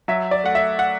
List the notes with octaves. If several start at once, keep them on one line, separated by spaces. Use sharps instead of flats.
F#3 E5
D5
A3 F#5
E5
F#5